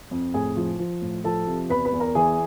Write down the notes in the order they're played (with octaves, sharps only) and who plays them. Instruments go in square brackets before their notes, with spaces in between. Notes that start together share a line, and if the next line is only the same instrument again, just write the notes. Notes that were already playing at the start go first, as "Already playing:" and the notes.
[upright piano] F2
A2 G#4 G#5
F3
F3
A2
F3 A4 A5
C3
E2 B4 B5
B4 B5
E2
A#4 A#5
E3 G#4 G#5